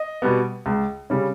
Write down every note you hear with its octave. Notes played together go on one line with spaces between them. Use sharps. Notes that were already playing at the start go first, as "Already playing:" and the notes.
Already playing: D#5
B2 G3 B3
C#2
C#3 G3 C#4